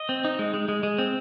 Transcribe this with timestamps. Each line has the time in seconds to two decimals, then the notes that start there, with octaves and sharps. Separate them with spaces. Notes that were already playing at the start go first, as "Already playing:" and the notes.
Already playing: D#5
0.09 C4
0.24 D#4
0.39 G#3
0.54 G#3
0.69 G#3
0.83 G#3
0.98 C4